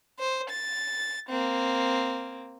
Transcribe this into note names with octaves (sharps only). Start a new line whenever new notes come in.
C5
A6
A#3 C4